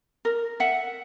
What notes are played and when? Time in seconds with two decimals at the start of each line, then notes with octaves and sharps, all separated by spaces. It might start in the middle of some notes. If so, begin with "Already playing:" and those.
0.25 A#4
0.60 E5 F#5